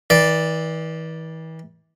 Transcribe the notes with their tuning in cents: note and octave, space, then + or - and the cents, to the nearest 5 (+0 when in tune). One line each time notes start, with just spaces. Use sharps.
E3 -40 D5 +0